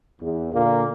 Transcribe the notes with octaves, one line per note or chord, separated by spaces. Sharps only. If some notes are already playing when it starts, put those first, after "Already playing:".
E2
A#2 D3 A#3